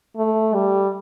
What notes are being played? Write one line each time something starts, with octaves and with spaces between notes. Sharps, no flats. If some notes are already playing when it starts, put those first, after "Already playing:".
A3
G3